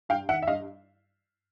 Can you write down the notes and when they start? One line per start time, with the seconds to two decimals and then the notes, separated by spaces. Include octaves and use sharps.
0.09 G2 F5 G5
0.29 D#3 E5 F#5
0.42 E5
0.47 G2 D#5 F5